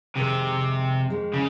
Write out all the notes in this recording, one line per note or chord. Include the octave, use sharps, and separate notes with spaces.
F2 C3 D#3 G#3
F2 D#3 G#3
C#3